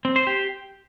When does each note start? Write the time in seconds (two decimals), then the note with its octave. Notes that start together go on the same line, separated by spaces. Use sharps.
0.05 C4
0.16 C5
0.27 G4